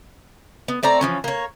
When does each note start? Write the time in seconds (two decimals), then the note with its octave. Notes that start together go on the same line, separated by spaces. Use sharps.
0.68 B3
0.83 A3 C4 D5 A#5
1.01 E3 F3 C#4
1.24 A#3 C#5